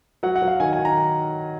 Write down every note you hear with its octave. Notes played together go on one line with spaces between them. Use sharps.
F#3 F#5
F#5
F#3
F5
D#3 G#5
G#5
D#3
A#5